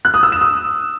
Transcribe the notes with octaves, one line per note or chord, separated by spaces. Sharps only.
F#6
D#6
E6
E7
D#6